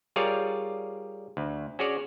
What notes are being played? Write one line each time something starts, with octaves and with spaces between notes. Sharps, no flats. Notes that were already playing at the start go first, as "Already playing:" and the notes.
G3 F4 G#4 A#4 C#5 D5
D2
C#4 F#4 G#4 C#5 D5